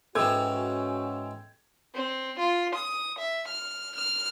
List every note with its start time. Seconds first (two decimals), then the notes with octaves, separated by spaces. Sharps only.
0.15 G#2 E3 C#4 F#4 A4 G5 E6 G#6
1.95 C4
2.39 F4
2.75 D#6
3.19 E5
3.48 F6
3.96 F6